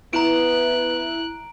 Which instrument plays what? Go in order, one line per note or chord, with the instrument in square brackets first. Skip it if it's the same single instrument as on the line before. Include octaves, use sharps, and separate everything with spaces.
[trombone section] B3 [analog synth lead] E4 [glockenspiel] A#5 D7 [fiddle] F#6